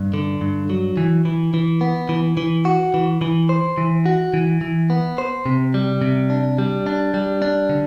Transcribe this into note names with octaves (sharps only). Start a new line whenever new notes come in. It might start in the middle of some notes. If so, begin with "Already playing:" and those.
Already playing: G2
D3
G2
F#3
E3
E3
E3
B3
E3
E3
F#4
E3
E3
C5
E3
F#4
E3
E3
B3
C5
C3
G3
C3
D4
G3
D4
G3
D4
D3